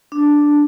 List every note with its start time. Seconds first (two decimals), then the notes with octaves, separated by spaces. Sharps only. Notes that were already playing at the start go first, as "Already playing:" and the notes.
0.12 D4